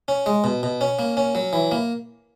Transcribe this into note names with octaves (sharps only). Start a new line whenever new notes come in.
C#4
G#3
B2
B2
C#4
A#3
C#4
F#3
E3
A#3